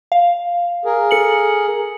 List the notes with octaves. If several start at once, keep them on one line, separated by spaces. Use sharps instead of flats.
F5
G#4 A#4
A4 C#7 F#7